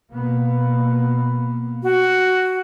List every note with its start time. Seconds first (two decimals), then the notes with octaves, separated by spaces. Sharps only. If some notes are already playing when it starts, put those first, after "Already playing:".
0.11 B2 A#3 B3
1.83 F#4